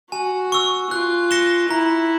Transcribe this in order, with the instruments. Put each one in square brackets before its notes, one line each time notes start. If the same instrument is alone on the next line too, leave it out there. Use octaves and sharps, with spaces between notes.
[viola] F#4 [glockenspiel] G#5
[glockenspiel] C#6 E6
[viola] F4 [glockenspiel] F#6
[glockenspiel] A#6 C#7 E7 G7
[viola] E4 [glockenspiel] A#5